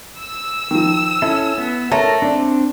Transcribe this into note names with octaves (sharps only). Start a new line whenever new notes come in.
E6
D#3 F3
C#4 E4 A4
B3
A3 A4 A#4 C#5 A5 A#5
C4 D4 D5